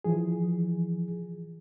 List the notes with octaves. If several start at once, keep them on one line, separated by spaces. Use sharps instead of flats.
E3 F3 G#4